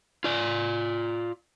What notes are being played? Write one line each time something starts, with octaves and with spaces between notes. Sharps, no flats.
F4 D5